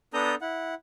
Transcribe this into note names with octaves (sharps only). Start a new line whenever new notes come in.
B3 D4 A4 A#5 D#6 G6
E4 F#5